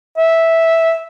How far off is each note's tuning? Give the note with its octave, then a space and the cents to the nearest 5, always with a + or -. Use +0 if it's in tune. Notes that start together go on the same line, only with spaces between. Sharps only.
E5 -5